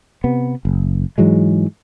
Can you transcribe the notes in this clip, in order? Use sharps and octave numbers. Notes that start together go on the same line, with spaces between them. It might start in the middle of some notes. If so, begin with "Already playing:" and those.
C3 B3
F#1
G#2 E3 F#3 G#3